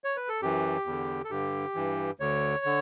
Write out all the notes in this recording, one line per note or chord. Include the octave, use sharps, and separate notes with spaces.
C#5
B4
A4
F#2 E3 G4
E2 D3
A4
G2 D3 G4
G2 E3
D2 D3 C#5
D3